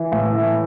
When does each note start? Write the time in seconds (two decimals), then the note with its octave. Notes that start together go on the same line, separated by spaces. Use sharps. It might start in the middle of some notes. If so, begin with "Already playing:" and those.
Already playing: E3
0.12 A2
0.34 E3